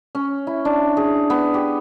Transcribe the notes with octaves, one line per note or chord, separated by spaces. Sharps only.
C#4
E4
D4
G#4
B3
G4